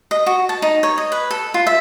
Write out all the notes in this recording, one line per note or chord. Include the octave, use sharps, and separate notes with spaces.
D#5
F#4
A5
D#4
C#5
D#5
B4
A4
F4
E5